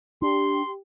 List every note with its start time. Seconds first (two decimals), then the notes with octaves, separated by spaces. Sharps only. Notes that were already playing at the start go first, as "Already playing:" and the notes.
0.22 D4 G4 C6